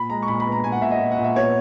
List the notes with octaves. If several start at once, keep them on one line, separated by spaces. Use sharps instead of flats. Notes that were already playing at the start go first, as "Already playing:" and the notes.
Already playing: A#2 B5
G#3 A#5
C#6
A#2 B5
B5
B3
A#5
A#2 G#5
F#5
A#2 E5
D#5
A#2
F#5
A#2
E5
B3 C#5